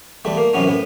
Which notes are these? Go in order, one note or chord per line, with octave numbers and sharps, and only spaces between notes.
E2 G3 A3
A#3
F#2 C3 E3 B3 C#4
A2 B3